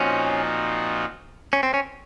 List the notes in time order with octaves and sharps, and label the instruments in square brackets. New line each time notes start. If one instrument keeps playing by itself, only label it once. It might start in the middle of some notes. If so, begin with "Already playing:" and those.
Already playing: [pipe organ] A#2 F3 C4 D#4 F#4 [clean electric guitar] C#4
[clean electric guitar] C#4
C4
C#4